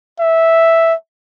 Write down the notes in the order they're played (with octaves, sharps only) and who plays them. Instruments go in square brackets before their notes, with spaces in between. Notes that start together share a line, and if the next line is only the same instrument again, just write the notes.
[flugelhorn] E5